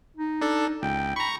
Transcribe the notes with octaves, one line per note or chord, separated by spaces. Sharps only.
D#4
D4 A4
C#2 G5
A#5 B5 C#6